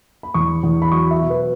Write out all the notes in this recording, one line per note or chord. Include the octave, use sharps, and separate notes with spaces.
B5
E2 C#6
E2
B5
F#3 C#6
E5
B2
B4